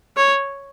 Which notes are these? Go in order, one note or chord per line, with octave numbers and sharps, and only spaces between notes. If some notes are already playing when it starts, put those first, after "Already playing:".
C#5